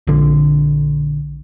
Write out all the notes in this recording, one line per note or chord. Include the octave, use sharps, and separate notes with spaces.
A#1 D3